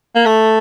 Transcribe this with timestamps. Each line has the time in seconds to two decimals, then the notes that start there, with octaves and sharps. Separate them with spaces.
0.15 A#3
0.26 A3